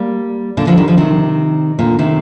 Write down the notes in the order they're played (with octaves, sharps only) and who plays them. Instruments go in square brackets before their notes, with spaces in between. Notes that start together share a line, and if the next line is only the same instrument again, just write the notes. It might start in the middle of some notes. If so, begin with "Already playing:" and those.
Already playing: [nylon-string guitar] G3 A#3
A#2 D3
D3 F3
D#3 G3
D3 F3
C3 D#3
A#2 D3
C3 D#3